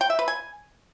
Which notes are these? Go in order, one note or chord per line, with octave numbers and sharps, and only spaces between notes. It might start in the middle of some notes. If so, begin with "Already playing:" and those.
G5
E5
B4
G#5